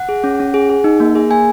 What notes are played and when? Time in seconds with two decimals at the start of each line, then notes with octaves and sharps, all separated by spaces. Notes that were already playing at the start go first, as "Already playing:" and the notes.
Already playing: F#5
0.09 G#4
0.24 C#4
0.40 C#4
0.54 G#4
0.70 G#4
0.84 D#4
1.00 A#3
1.15 G#4
1.30 A#3 G#5